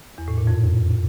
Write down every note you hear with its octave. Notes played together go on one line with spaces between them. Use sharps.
E2
A2
A#2
F2